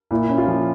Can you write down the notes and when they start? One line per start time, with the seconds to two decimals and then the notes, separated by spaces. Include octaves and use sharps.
0.11 A#2 E4
0.29 C#4
0.38 F4
0.48 F3